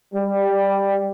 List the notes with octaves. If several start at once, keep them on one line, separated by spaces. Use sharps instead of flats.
G3